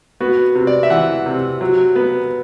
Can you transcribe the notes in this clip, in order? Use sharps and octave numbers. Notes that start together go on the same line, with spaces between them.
B3 F#4
C3
D5
E5
E3 F#5
C3
F#3
B3